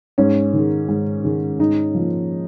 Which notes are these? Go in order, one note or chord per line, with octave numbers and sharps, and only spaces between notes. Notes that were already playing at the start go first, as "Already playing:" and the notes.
G#2 C#4
D#3 G#3
G#2
D#3 G#3
G#2 D#4
F3 A#3